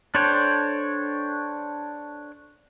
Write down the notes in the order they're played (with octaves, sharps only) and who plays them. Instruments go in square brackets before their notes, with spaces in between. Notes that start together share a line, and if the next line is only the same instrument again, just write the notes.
[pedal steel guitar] D4 A4 C5 C#5 G5